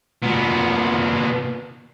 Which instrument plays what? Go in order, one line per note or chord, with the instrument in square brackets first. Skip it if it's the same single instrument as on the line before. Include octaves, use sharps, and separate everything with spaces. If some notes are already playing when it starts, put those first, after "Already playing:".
[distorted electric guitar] A#2 B3